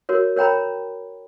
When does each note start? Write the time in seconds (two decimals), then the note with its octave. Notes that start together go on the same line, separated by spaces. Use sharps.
0.09 F#4 A#4 C#5
0.36 A#4 C#5 G5 A#5 B5